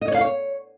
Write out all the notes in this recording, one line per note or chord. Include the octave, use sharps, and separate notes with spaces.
D#5
C#5
F5
C#5